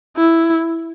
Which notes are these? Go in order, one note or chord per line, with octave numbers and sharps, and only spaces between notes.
E4